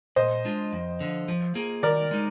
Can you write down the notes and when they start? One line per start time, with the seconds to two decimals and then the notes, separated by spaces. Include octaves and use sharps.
0.16 A#2 C5 D#5
0.45 G#3 D4 F4
0.73 F2
1.00 D3 F3
1.28 F3
1.55 A#3 F4 G#4
1.83 D#3 A#4 D5
2.11 G#3 D#4